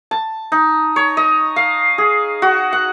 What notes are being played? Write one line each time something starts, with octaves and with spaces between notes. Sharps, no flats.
A5
D#4
C#5
D#5
F5
G#4
F#4
F#5